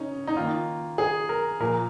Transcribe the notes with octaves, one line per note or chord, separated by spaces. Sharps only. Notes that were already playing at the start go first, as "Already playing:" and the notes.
Already playing: C#3 C#4 D#4
D#4
D#3 A#3 F4
G#4
A#4
A#2 F3 A#3 A#4